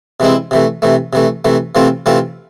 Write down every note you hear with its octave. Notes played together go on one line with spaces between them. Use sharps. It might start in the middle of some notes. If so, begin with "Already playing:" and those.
C3 E3 G#3 C4 E4
C3 E3 A3
C3 E3 A3
C3 E3 A3
C3 E3 A3
C3 E3 A3 C4 F4
C3 E3 A3 C4 F4